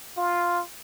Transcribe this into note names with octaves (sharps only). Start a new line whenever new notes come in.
F4